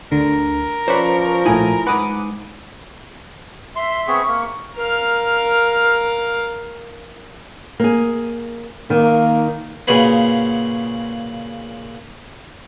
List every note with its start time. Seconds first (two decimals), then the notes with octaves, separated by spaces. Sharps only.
0.12 D2 D3 A#4
0.88 F3 C#4 B4 C5 D5 C#6
1.46 A#1 A2 E4 G#5 D#6
1.87 G#2 B4 F#5 D6 D#6
3.76 E5 C6
4.07 B3 C4 G#4 C#6
4.28 A#3
4.76 A#4 F5
7.80 A#3 G#4
8.90 D#3 A#3
9.87 A#2 C#3 F#4 G#4 B4